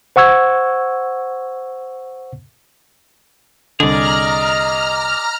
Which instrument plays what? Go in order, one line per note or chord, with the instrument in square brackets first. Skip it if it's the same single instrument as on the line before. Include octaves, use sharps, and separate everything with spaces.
[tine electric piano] C5 F#5 C#6 E6 G#6
[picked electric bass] C2 D3 [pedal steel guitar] G#4 D5 [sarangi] D#5 [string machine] A#5 F6